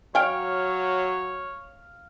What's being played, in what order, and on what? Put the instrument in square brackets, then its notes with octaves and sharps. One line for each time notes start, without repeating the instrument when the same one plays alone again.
[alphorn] F#3 [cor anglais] C#5 [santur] F5 [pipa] G5 G#5